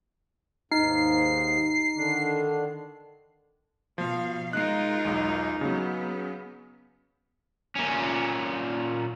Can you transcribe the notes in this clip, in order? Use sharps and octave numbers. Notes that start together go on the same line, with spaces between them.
D#2 G#2 D#4 C7
D3 D#3 D4
B2 F3 F5
G#3 D#4 F4 A#4 F#6 C7
B1 E2
C#3 F#3 B3
A#2 C#4